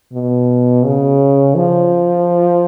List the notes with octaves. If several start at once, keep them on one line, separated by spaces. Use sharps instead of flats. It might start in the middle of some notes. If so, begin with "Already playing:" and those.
B2
C#3
F3